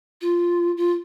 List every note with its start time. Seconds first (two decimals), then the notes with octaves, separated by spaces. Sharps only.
0.21 F4
0.77 F4